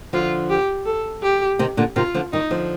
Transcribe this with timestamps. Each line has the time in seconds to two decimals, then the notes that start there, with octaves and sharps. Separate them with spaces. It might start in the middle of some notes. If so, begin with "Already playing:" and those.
0.13 D3 F3 F4
0.50 G4
0.86 A4
1.23 G4
1.59 C3 D#3
1.77 A#2 D3
1.96 C3 D#3 F4
2.14 D3 F3
2.33 D#3 G3 D#4
2.50 D3 F3